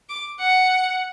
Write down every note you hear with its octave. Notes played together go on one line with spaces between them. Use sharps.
D6
F#5